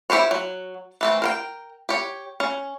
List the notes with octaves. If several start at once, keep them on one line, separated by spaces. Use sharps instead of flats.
E4 G4 C5 C#5
F#3
E3 A3 C4
A#4 C5 G5
G4 C#5
C#4